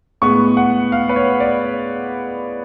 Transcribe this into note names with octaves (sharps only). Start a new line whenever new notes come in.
A2 G#3 B3 C#6
F#5
F5
B4
C#5
D5